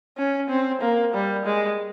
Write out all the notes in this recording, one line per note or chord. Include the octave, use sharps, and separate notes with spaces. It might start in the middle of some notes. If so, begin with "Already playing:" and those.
C#4
C4
A#3
G3
G#3